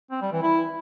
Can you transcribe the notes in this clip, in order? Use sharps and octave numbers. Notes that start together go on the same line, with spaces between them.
C4
G3
E3
E4